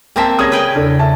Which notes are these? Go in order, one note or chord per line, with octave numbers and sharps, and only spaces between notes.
A#3 C4 E5 G5 A5
C#3 G3 D#6 G#6 A#6
B4 G5 G#5
E2 C#3 D4 A4
E5 A5